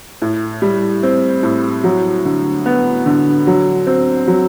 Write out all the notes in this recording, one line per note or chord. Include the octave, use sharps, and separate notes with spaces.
A2
G3
C4
A2
F#3
D3
B3
D3
F#3
C4
F#3